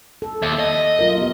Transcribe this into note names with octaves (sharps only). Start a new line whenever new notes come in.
A4
D#2 E5
D#5
F#3 F4 A#4
B3 G4